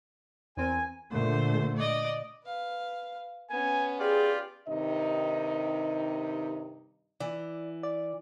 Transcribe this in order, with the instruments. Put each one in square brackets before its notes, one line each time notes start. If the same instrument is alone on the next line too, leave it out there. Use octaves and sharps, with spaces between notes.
[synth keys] E2 C4 A#4 [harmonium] G#5
[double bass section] A#2 D3 A3 [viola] C5
[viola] D5 D#5
[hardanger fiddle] B4 F5
[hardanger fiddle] B3 C#4 [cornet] G#5
[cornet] F4 [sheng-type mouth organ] G4 D5 [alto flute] G#4
[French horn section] G2 C3 D#3 D#4 D#5
[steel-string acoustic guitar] E3 [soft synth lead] D5
[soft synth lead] D5